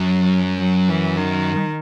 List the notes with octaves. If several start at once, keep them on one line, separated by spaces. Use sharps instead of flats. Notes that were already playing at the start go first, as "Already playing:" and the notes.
Already playing: F#2 F#3
F#3
E3
D#3